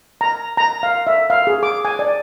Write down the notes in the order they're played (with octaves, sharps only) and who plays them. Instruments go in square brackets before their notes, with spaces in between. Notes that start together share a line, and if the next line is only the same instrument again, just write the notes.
[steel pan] A#5
A#5
F5
E5
F5
G#4
D6
G#5
D5